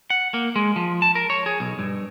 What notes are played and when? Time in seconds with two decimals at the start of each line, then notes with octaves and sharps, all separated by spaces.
0.10 F#5
0.34 A#3
0.56 G#3
0.76 F3
1.02 A5
1.15 A#4
1.30 C#5
1.46 G#4
1.60 B1
1.79 G2